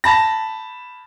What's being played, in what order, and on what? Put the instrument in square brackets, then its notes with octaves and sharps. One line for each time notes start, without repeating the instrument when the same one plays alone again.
[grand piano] A5 B5 A#6